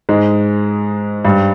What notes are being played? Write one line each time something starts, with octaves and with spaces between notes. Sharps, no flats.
G#2 G#3
G2 G3